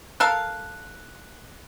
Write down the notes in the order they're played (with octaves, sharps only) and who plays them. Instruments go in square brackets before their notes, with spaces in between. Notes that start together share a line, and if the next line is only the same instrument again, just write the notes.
[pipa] A4 A#4 F5 [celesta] F#6